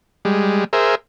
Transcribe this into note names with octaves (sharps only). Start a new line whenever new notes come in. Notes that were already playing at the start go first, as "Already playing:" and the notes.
G3 G#3
G#4 A#4 C5 E5